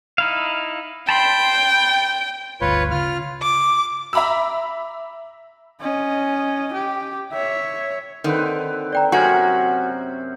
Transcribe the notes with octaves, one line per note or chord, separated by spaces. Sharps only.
D#4 E4 F5
G5 A5 B5 C6
G1 D2 F4 B4 C#5
C#3 F4 F6
D6
E5 A#5 B5 D6 E6
C#4 D#5
G4
C#5 E5
D3 D#3 C4 B4
D5 G5 A#5
F#2 C3 F#4 A#4 G#5 G#6